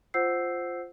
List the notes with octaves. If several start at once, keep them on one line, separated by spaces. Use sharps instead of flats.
F4 C5 F#5 E6 G6 C7